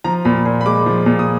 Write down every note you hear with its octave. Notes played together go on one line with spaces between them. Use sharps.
F3 A#5
A#2 B5
A#2
B5
G#3 D6
F3
A#2
D#6